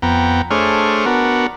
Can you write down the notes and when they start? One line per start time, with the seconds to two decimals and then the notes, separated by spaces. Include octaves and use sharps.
0.02 F2 B3 G5 A#5
0.51 A3 D4 G#4 C5 C#5 F6
1.06 B3 D4 F#4 A#4